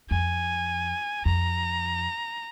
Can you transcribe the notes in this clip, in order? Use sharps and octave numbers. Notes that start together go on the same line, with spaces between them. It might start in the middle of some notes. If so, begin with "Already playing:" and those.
F2 G#5
F2 A#5